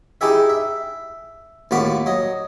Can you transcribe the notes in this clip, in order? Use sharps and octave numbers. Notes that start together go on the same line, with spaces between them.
D#4 E4 G4 G#4 E5
E5
D#2 A2 F4 F#4 B5 D6
F#3 D#5